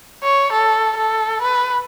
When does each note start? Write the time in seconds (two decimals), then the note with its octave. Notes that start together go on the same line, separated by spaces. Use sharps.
0.23 C#5
0.52 A4
0.97 A4
1.41 B4